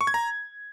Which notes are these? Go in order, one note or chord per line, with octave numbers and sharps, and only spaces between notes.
C#6
G#6
A#5